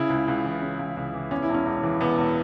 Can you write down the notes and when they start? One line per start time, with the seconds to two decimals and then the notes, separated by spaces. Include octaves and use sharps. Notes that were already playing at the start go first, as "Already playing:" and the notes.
Already playing: C#3 E4
0.10 C#2
0.28 C#2
0.45 E3
0.62 C#3
0.79 C#2
0.97 C#2
1.14 E3
1.31 E2 C#4
1.42 E4
1.49 E1
1.54 C#4
1.66 E1
1.83 E3
2.01 E2 B3
2.18 E1